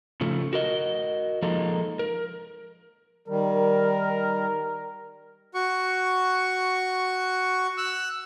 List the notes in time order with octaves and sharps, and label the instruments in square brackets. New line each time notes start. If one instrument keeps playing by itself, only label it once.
[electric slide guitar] C#3 F3 A3
F#4 A#4 D#5
F3 G#3 A#3 D#4 A4
A#4
[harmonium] D#3 G3 [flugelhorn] A#4
[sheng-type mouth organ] F#4 C#6
E6 F#6